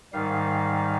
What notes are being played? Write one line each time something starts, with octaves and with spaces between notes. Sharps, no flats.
G#2 D#3 G3 F5